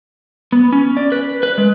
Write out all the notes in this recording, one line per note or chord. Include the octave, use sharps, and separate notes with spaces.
B3
C#4
D5
B4
B4
G#3